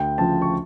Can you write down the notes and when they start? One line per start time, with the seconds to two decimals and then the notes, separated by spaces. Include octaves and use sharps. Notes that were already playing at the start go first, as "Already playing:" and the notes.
Already playing: D2 G5
0.18 C#3 F3 A5
0.42 C#6